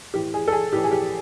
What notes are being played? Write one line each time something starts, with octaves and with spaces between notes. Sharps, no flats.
A2 E3 G4
G#4
A4
G#4
A2 E3 G4
G#4
G4